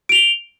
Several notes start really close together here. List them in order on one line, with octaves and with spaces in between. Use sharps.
D7 F7 G7